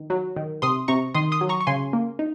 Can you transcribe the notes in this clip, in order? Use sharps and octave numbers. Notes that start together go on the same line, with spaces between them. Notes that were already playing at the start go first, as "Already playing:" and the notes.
Already playing: D#3
F#3
D#3
C3 C6 D#6
C3 A#5 C#6
D#3 C6 D#6
C6 D#6
F#3
A#5 C#6
C#6
C#3 G#5 C6
A#3
D#4